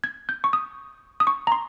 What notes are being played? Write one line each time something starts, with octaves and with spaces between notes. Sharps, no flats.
G#6
G6
C#6
D#6
D#6
C#6
A#5
C6